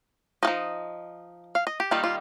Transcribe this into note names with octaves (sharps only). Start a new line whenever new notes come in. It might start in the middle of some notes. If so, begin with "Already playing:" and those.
F3 A#3 D#4 D#5
F5
D#5
G4
D#3 G3 A#3 D#4 F4
F4